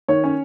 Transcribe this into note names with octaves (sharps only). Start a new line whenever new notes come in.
D#3 C#5
C#4